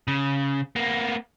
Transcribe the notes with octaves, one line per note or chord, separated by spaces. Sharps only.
C#3
A#3 B3